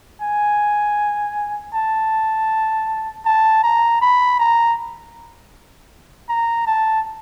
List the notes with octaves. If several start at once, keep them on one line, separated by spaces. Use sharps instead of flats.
G#5
A5
A5
A#5
B5
A#5
A#5
A5